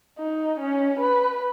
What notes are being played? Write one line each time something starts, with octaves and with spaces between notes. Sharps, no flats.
D#4
C#4
B4